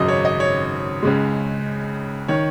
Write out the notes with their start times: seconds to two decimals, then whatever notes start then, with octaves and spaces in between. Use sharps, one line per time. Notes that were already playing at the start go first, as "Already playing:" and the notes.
Already playing: G#1 F#2 C#3 F#3 D#5
0.08 C#5
0.25 D#5
0.40 C#5
1.02 C#2 C#3 G#3
2.28 D#3 C#5